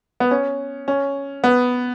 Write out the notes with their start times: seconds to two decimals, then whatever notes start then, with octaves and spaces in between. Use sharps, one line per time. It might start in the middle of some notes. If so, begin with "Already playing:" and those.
0.20 B3
0.31 C#4
0.88 C#4
1.44 B3